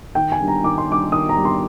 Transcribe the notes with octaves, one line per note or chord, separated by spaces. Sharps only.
D#3 G5
G#5
G3 D4
A#5
D#3 D6
C6
G3 D4 D6
D#3 D#6
A#5
G3 D4
C6